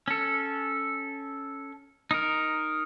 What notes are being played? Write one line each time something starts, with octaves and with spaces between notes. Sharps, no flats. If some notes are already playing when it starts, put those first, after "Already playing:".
C#4 A4
D#4 A#4